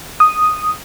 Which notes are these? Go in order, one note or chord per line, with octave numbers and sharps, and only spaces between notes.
D#6